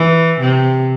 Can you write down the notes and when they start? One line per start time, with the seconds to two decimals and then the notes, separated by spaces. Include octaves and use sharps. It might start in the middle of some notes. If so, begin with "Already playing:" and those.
Already playing: E3
0.40 C3